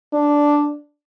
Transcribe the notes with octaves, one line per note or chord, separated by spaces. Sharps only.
D4